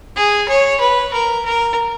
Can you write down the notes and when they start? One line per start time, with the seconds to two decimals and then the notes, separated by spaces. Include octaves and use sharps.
0.16 G#4
0.49 C#5
0.80 B4
1.13 A#4
1.45 A#4